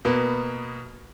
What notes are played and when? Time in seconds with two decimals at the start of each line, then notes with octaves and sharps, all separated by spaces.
0.05 B2 A#3 B3